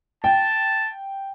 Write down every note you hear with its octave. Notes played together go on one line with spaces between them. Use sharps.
G5 A5